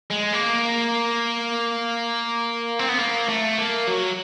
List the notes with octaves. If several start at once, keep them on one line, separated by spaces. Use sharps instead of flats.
G#3
A#3
C4
B3
A#3
A3
A#3
F#3